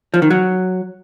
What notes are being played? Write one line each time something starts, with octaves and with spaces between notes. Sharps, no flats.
F3
D#3
F#3